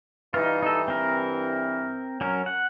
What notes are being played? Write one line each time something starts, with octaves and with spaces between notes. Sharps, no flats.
G2 E3 D#4 F4
D#4 A4
C4 A#4
F#3 C#4 A#4
F#5